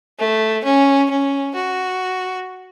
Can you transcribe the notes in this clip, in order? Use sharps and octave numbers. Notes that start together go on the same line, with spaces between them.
A3
C#4
C#4
F#4